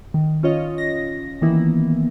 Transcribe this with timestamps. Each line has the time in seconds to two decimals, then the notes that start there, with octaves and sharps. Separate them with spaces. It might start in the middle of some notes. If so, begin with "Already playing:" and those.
0.14 D#3
0.43 C#4 F4 C#5 D#5
0.78 A#6
1.42 D#3 E3 A#3 B3 E4